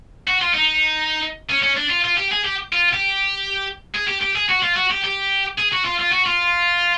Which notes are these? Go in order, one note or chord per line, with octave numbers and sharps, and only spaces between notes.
F#4
F4
D#4
C#4
C#4
D4
F4
F4
G4
G#4
G4
F4
G4
G#4
G4
G4
G#4
F#4
F4
F#4
G4
G4
G#4
F#4
F4
F4
F#4
F4